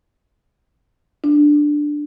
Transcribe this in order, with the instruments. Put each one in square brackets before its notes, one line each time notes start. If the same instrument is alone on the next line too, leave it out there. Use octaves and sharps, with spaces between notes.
[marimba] D4